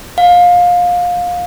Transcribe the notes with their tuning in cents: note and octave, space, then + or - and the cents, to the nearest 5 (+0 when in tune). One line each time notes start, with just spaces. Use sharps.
F5 +25